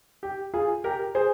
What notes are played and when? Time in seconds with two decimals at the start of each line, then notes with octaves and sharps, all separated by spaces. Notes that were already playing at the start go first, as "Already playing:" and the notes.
0.23 G4
0.54 F4 G#4
0.84 G4 A#4
1.15 G#4 C5